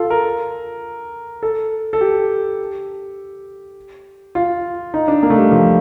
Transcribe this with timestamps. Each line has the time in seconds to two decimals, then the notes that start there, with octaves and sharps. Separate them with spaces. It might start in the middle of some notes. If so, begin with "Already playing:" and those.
Already playing: F4 A4
0.10 A#4
1.43 A4
1.93 A4
2.01 G4
4.35 F4
4.94 D#4
5.08 D4
5.23 A#3
5.30 A3
5.37 G3
5.52 F3